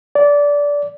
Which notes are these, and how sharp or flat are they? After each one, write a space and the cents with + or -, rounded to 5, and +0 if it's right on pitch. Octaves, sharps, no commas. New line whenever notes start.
D5 -20